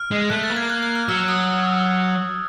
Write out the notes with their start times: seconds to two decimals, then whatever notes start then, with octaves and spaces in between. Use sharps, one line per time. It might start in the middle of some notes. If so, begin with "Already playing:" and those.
Already playing: F6
0.11 G#3
0.30 A3 F#6
0.43 A6
0.50 A#3
0.56 G#6
0.70 F#6
0.83 F#6
0.95 F6
1.09 F#3 E6
1.28 D#6